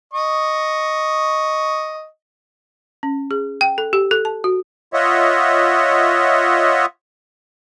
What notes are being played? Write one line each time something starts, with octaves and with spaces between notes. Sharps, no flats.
D#5 C#6
C#4
G#4
G5
A4
G4
A4
A5
F#4
F4 C#5 D#5 E5 F#5